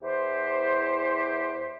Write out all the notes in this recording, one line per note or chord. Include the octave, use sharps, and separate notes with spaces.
E2 E3 G4 C5